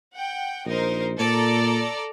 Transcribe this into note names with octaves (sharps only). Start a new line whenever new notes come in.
F#5 G5
A#1 D#4 A#4 C5
A#2 A4 D5 A#5